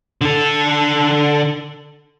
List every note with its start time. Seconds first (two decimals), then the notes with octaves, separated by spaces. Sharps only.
0.21 D3 A4